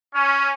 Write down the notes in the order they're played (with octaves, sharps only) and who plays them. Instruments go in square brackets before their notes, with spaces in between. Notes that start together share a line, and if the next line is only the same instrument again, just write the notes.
[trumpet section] C#4